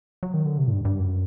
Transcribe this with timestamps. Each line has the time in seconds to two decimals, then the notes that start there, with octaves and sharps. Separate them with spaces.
0.23 F#3
0.34 D#3
0.45 D3
0.58 C3
0.67 A2
0.72 G2
0.85 G2
0.99 F#2